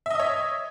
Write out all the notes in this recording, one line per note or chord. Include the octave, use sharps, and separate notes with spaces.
C#5 D#5 E5 D#6